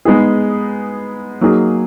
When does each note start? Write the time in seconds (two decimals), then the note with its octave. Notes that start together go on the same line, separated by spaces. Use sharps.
0.05 G#3 B3 D#4 G#4
1.41 F#3 A#3 D#4 G#4